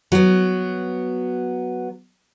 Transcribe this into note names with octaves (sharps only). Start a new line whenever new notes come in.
F#3 B3